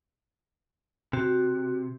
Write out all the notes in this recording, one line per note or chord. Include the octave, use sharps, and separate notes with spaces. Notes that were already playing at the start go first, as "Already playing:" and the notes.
C3 F#4